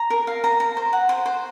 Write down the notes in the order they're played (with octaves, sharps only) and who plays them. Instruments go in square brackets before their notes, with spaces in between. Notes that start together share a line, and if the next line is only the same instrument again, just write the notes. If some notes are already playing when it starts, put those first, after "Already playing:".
Already playing: [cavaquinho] A#5
A#4
F5
A#5
A#5
C5
F#5
C5
C5